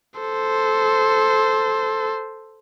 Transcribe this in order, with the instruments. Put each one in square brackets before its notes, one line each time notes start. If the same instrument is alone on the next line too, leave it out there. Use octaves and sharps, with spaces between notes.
[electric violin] A4 C5